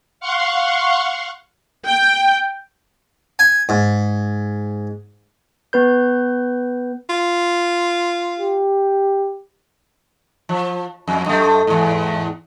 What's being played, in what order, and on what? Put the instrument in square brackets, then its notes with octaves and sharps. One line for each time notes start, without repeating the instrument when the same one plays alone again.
[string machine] F5 F#5 C6 C#6
[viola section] G5
[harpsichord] G#5
G#2
[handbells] B3 B4 G6
[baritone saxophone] F4
[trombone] G4
[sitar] F3
F2
F#2 A3
E2 G#2